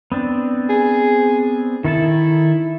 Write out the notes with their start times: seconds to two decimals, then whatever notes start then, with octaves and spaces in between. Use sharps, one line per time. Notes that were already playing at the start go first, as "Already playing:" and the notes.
0.12 B3 C4 D4
0.70 G#4
1.84 D#3 E4 A4 A5